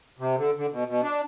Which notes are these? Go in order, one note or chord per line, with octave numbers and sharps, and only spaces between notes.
C3
D3
D3
B2
B2
D4